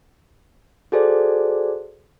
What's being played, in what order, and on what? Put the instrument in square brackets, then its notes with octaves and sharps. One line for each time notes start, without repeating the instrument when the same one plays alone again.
[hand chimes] F#4 G#4 A4 C5 D5